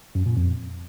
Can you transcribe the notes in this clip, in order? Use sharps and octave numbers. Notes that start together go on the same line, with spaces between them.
F#2
A#2
F2